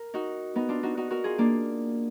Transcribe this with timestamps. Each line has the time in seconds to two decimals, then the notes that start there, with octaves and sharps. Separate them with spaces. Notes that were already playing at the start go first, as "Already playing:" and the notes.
Already playing: A#4
0.14 D#4 F#4
0.56 B3 D#4
0.69 D4 F4
0.83 D#4 F#4
0.97 D#4 F#4
1.11 F#4 A#4
1.24 F4 G#4
1.38 A#3 D4